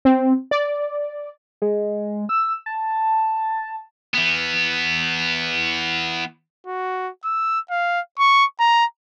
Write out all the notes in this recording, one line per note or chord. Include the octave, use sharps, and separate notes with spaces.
C4
D5
G#3
E6
A5
E3 B3
F#4
E6
F5
C#6
A#5